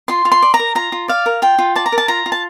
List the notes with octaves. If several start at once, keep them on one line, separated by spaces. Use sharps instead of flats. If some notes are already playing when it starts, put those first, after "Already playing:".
F4 C6
F4
C6
D5
A#5
A#4
F4 A#5
F4
D5 F5
A#4
F4 G5
F4
D5 A5
A#5
A#4
A5
F4 A#5
F4
A5